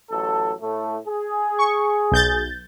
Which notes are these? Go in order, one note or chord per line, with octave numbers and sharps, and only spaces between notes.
A1 F#3 A4
A2 A3
G#4
C#6
B1 G6 A6